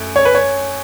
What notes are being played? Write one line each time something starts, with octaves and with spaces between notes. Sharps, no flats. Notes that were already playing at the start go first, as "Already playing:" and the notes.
Already playing: F#2 A3
C#5
B4
C#5